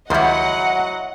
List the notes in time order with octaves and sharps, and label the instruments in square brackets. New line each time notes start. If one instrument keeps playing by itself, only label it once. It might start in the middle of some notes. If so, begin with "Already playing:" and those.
[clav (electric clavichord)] C#2 D#3 G3 [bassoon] F#3 [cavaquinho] E4 C6 [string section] D#5 F#5